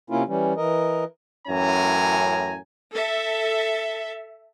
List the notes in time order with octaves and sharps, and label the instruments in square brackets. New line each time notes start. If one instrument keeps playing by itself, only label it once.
[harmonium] C3 A#3 C#4 E4 F4
E3 G3 C#4
E3 A#4 D#5
[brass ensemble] F#2 A2 E3 C#4 G#5 A#5
[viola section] A4 E5